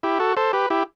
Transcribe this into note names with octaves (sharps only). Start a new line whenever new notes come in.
E4 G4
F#4 A4
A4 C5
G4 B4
E4 G4